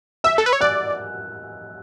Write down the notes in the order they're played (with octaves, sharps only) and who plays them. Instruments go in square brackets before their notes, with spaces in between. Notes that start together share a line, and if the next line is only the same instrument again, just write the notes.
[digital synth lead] E5 [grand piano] E6
[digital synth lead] A4
B4
C#5
[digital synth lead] D5 [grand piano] F#6